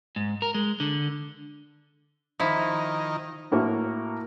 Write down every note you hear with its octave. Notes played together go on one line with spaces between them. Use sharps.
G#2
A#4
G#3
D3
D#3 F3 E4
A2 A#3 F#4 A#4